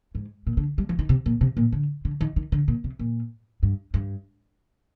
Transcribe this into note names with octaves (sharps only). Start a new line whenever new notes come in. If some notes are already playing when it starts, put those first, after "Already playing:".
G#2
A#2
D3
G3
F3
D#3
C3
A#2
C3
A#2
D3
D3
D#3
D#3
D3
A#2
C3
A#2
G2
G2